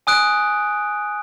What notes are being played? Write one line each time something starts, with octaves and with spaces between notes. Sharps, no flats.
G#5 D#6 F#6 D7